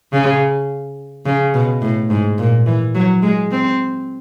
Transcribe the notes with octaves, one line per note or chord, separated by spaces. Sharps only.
C#3
C#3
B2
A2
G#2
A#2
E3
F#3
G#3
C4